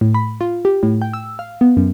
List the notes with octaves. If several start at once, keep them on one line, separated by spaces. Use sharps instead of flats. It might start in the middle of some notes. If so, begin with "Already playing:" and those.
A2
B5
F4
G4
A2
G5
E6
F5
B3
F#2